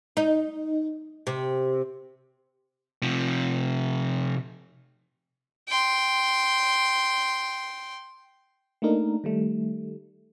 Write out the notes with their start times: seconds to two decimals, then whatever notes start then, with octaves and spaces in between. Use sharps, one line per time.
0.17 D#4
1.27 C3
3.02 C3 F3
5.68 G5 C6
8.82 A3 A#3 D4 D#4 A#4
9.24 D#3 G3 A3